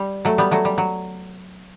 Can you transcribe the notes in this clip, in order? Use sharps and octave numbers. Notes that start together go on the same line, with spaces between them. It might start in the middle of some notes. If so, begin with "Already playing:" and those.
Already playing: G3
F#3 A3
G3 B3
F#3 A3
G3
F#3